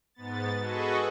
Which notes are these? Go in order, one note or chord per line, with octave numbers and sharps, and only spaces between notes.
G#2 B3 A6
F#4 G#4 A4 B4 D#5 C#6